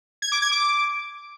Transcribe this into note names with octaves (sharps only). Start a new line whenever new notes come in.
G#6
D6
G#6
D6